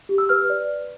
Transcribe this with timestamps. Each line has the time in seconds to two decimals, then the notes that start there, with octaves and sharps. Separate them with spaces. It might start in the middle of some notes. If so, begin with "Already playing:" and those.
0.09 G4
0.18 E6
0.29 B4 F6
0.50 D5